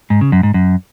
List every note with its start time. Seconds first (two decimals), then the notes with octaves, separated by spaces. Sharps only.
0.10 G#2
0.21 C#3
0.32 F#2
0.43 G#2
0.54 F#2